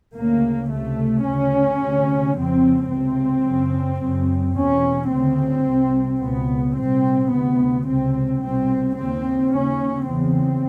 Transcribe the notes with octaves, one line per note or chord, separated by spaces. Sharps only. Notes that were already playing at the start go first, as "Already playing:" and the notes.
D2 C#3 A#3
C#2 C3 A3
D2 C#3 C#4
D2 C3
F2 C#3 C4
C#2 C3 C4
F#2 C#3
F#2 C#3
E2 B2 C#4
D2 C#3 C4
C2 C3
C#2 B2 B3
C2 A#2 C4
D2 C3 B3
C#2 C3 C4
C2 B2 C4
D#2 C#3 C4
D#2 C#3 C#4
E2 C#3 C4